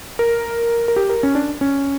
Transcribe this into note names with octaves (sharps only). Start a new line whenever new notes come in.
A#4
A#4
G4
A#4
C#4
D4
C#4